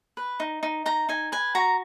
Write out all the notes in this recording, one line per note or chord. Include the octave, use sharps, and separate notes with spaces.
B4
D#4
D#4
D#4 A#5
D#4 G#5
B4 G#5
F#4 A#5